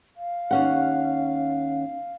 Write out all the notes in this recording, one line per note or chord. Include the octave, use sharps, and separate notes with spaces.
F5
D#2 C#4 F#5